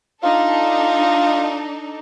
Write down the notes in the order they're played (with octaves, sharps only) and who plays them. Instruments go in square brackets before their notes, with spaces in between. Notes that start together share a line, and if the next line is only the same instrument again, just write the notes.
[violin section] D4 D#4 A4 [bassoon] F4